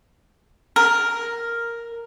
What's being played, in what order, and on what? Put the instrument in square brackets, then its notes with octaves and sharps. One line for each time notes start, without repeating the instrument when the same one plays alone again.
[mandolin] A#4